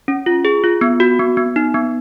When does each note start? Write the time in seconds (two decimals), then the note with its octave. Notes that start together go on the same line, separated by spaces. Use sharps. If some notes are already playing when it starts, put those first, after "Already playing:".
0.08 C#4
0.26 F4
0.45 G#4
0.64 F4
0.81 B3
1.00 F#4
1.19 B3
1.37 B3
1.56 D#4
1.74 B3